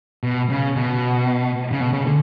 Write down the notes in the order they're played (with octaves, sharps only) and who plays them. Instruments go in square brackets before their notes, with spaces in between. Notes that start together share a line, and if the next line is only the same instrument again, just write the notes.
[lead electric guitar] B2
C#3
B2
C#3
B2
C#3
D3